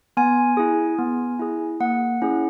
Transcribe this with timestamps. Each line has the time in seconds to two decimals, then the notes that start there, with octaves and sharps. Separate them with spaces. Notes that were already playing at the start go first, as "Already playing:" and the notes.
0.17 B3 G#5
0.57 E4 G#4
0.98 B3
1.39 E4 G#4
1.80 A#3 F#5
2.22 C#4 E4 G#4